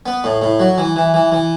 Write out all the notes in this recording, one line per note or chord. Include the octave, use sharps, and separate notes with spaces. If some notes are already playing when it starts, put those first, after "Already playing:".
B3
A2
A2
F#3
E3
E3
E3
E3